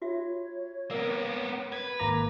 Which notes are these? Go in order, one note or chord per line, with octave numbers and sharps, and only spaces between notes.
F4 F#4 C#5 E5
A#3 B3 A#4 D5 F5
B4 G#6
G#1 A#3 A#5 D6